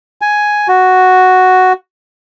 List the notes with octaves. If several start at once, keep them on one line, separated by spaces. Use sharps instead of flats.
G#5
F#4